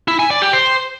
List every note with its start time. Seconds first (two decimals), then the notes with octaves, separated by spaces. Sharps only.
0.08 E4
0.19 G#5
0.31 D5
0.42 G4
0.53 C5